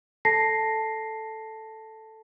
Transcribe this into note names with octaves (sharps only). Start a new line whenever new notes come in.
A4 A5 A#6 C7